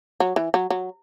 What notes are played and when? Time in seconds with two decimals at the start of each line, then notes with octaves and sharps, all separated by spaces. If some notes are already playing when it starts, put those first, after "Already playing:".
0.20 F#3
0.36 E3
0.54 F#3
0.70 F#3